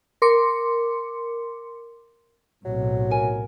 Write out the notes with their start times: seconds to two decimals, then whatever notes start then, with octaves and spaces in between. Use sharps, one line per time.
0.22 A#4 C6 D6 C#7
2.65 B1 A2 C3 F#3
3.11 A#4 G#5